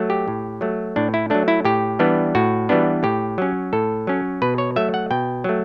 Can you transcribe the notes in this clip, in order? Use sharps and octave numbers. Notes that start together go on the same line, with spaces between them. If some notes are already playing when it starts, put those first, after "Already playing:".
Already playing: F#3 A3
G4
A2
F#3 A3
A2 D4
E4
F#3 A3 D4
E4
A2 G4
E3 G3 B3 D4
A2 F#4
E3 G3 B3 D4
A2 G4
F#3 C#4
A2 A4
F#3 C#4
B2 B4
C#5
F#3 A3 E5
F#5
B2 G5
F#3 A3